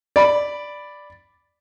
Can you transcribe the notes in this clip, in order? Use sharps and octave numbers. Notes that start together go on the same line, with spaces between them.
D5 B5